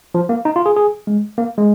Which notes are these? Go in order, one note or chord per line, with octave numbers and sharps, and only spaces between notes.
F3
A#3
D#4
F4
G#4
G#4
G#3
A#3
G#3